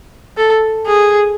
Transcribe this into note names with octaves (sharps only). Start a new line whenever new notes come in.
A4
G#4